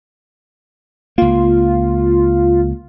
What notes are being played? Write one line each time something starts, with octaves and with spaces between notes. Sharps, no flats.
C#2 A#3 F4